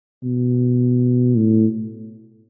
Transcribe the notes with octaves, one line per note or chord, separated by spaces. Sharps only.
B2
A2